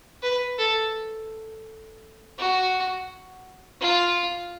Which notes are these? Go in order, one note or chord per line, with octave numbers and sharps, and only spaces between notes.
B4
A4
F#4
F4